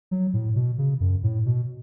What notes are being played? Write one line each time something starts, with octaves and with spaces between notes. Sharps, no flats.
F#3
A2
B2
C#3
F#2
A2
B2